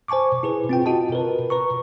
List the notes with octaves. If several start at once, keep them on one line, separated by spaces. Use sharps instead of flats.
C5 G#5 A5 C#6 D6
E4 G#4 B4
C4 F4 G5
F4 F#4 D#5 A5
A#4 B4
B4 A#5 C#6